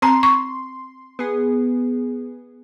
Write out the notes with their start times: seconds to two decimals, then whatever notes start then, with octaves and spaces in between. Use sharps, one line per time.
0.02 C4 A5 A#5 C6
0.23 C#6
1.19 B3 G#4